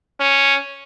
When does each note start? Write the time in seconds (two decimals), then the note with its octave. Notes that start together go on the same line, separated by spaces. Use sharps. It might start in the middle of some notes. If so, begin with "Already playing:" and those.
0.20 C#4